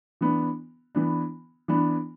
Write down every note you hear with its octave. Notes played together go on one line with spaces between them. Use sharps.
E3 B3 D4
E3 B3 D4
E3 B3 D4